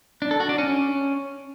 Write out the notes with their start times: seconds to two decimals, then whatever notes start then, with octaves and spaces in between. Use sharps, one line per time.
0.22 D4
0.31 A4
0.40 F#4
0.49 D4
0.58 C#4